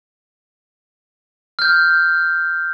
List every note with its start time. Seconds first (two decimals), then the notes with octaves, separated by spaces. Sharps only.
1.59 F6 G6